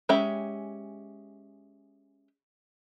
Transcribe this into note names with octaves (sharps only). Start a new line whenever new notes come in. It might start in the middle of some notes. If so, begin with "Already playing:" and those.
G#3 C#4 G4 E5 B5